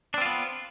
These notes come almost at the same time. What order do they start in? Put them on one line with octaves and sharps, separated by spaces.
D4 C4 F4 B3